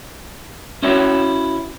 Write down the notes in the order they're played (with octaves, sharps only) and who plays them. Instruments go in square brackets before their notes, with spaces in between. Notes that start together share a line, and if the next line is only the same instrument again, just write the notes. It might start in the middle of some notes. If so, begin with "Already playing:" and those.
[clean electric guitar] C#4 E4 F#4 C#5 E5